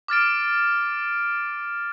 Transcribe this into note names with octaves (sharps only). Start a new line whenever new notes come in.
D6 F6 A6 D7